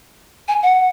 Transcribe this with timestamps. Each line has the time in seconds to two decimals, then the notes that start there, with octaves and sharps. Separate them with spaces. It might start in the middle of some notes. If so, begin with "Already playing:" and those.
0.48 G#5
0.63 F#5